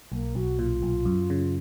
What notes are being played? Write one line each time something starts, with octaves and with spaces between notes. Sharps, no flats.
B1 A#3
B1 F#4
A#2 F4
B1
F#2
C#3